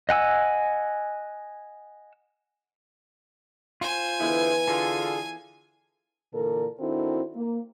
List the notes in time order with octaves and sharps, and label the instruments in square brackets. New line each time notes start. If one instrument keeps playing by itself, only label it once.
[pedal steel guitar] D#5 F#5 G#5 E6
[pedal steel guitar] F4 C5 [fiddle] G#5
[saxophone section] D3 G#3 E4 [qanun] E3 B3 E5
[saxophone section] D3 F4 [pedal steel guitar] G#4 A4
[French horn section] A#2 D3 E3 A4 A#4
D#3 C4 D4 E4 F#4 A4
A#3